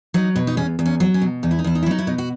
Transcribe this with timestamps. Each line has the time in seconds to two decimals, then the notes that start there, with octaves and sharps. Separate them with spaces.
0.14 F#3 D#4
0.36 B2
0.47 D#4
0.57 E2 C#4
0.79 E2
0.86 C#4
1.00 F#3
1.14 C#4
1.22 B2
1.43 E2 D#4
1.51 E4
1.59 D#4
1.64 E2 E4
1.75 D#4
1.83 E4
1.86 F#3 D#4
1.99 E4
2.07 B2 D#4
2.18 F#4